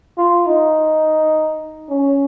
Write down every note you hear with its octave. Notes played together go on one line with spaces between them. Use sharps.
F4
D#4
C#4